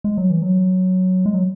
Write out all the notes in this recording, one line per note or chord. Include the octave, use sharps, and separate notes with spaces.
G#3
F#3
E3
F#3
G#3
F#3